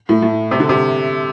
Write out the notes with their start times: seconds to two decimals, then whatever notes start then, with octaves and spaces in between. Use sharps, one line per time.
0.09 A2
0.22 A2
0.51 C3
0.60 D3
0.69 C3